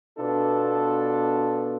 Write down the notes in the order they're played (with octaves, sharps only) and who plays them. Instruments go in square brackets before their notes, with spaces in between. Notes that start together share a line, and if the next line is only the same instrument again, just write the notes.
[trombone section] B2 B3 D4 F4 A4